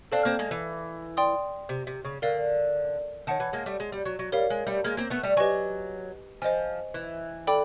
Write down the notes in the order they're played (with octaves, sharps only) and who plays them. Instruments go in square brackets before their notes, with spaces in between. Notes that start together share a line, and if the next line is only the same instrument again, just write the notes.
[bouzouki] C4 D4 [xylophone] A4 D5 F5 A5
[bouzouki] A#3 C4
G#3 A#3
E3
[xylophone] D5 G5 C6 D#6
[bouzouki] C3
C3
C#3
[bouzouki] D3 [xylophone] A#4 D5 F5
[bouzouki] D#3 [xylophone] C#5 F#5 A5
[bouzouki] E3
G#3 A#3
G3 A3
G#3
G3
F#3
F#3
[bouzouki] G3 [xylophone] A#4 C#5 F5
[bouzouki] G#3
G3 A3
G#3 A#3
A#3 C4
A3 B3
G3 A3
[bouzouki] F#3 [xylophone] G4 B4 D#5 G#5 C#6
[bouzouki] F3 [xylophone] C5 D#5 G#5
[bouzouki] E3
[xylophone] A4 D5 G5 B5 D6